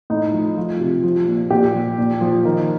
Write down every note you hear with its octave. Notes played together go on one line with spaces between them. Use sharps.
A2 D#4
F3
F3 F4
C3
F3
A#2
A#2 G4
F3
A#2
F3
D#3 A#4